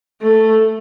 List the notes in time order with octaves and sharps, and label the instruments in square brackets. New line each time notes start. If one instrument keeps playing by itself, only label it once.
[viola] A3